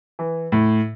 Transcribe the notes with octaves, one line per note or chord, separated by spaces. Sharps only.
E3
A2